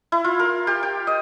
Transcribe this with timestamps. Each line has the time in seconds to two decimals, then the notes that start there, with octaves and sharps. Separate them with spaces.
0.12 E4
0.24 F4
0.39 A#4
0.67 G4
0.83 G5
1.07 D#5